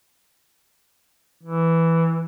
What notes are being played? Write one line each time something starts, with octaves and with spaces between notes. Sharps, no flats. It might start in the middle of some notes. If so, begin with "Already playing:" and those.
E3